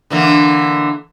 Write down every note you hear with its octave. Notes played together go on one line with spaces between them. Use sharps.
D3 E3 A#3